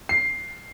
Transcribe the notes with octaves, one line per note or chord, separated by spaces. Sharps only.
C7